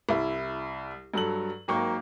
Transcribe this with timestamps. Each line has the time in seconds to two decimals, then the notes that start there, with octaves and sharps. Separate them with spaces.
0.09 C2 E4
1.14 G2 F#3 A4 F#7
1.68 G#1 F#3 A#3 G5 C#6